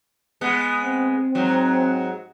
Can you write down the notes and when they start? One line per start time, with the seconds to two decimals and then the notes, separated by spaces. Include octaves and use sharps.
0.41 G#3 B3
0.80 C4
1.35 G#2 F#3